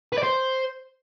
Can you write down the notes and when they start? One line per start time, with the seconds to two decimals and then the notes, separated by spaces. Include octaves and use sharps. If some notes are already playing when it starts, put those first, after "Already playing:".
0.13 B4
0.18 D5
0.23 C5